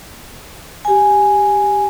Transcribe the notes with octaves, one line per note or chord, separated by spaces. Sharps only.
G4 G#5